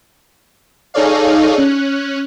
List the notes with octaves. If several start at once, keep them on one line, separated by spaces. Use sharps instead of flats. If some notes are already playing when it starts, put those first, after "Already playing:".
D#4 G#4 A4 C#5 D5 F5
C#4 F#6